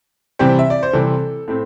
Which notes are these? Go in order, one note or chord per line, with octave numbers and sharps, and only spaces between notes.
C3 E3 G3 C4 G4 C5
E5
D5
C5
C3 E3 G3 C4 A4
A2 A3 C4